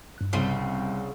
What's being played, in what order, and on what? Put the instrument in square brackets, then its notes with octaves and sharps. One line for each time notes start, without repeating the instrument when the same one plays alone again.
[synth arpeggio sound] G2 F#6
[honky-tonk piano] C2 [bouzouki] C#3 G3 C4